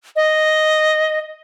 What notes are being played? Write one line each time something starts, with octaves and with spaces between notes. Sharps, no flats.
D#5